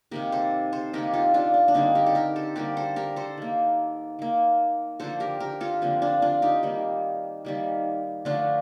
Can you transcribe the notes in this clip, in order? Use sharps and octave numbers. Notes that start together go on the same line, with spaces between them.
C3 D#3 A#3 G4 A#4
A4 C5
A4 C5
C3 D#3 A#3 G4 A#4
F4 A4
D4 F4
D4
D4
D3 G3 A#3 C4 D#4
G4 A#4
A4
G4 A#4
A4 C5
D3 G3 A#3 G4 A#4
A4 C5
G4 A#4
A4 C5
D#3 A#3
D#3 A#3
D3 F3 A#3 A4 C5
G4 A#4
G4 A#4
F4 A4
D3 F3 A#3 C4
D4 F4
D4 F4
D#4 G4
D#3 G3 A#3
D#3 G3 A#3
D3 F3 A3 D4 F4